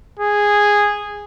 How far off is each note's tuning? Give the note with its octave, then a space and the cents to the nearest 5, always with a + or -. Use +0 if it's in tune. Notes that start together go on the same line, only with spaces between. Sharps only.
G#4 -10